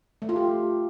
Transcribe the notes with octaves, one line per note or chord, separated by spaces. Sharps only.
A3
F4
G4